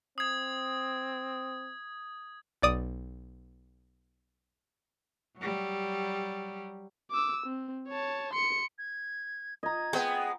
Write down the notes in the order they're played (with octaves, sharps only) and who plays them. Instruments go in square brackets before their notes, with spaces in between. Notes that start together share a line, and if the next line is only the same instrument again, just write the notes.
[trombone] C4 [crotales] D#6 G#6
[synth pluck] B1 D5 D#6
[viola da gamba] F#3 G3
[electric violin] D6 E6
C4
C#5 A5
C6 C#7
[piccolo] G#6
[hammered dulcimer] D#5 A#5 [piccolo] G#6
[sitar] G#3 B3 [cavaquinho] G5